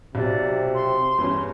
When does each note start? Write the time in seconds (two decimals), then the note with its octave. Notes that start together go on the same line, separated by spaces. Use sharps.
0.15 B1 C3 D5
0.74 C6
1.18 E2 G2 C#4